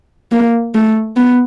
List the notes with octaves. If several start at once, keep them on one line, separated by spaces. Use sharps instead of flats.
A#3
A3
B3